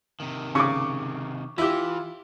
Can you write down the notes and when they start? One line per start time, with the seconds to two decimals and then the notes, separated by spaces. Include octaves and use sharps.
0.20 C3 D#3
0.55 C#3 C#6 D6
1.58 E3 E4 F4 G4